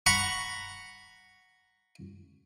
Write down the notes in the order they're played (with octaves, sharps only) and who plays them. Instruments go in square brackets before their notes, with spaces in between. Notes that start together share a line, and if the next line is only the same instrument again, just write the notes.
[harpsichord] F#5 A#5 B5 C#6